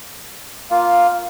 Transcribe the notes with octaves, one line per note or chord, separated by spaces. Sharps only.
A#3 F4